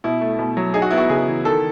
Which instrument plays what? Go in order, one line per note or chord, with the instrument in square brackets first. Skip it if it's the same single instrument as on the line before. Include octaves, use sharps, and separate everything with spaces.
[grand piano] B2 E4
A3
B2
F#3
D#4 G#4
F#4
B3 E4
F#4
C#3 G#4
E3
D#3 A4